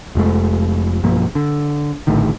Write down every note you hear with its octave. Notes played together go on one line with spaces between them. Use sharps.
F1 F2 G#3 A3
B1 G2 F3 A#3
D3
A#1 A2 D3 D#3